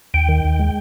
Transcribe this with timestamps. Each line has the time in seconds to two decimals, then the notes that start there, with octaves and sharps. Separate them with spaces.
0.14 D#2 G5
0.29 D#3
0.44 D#2
0.59 G#3